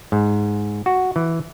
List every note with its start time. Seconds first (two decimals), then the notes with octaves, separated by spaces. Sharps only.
0.12 G#2
0.86 F#4
1.16 E3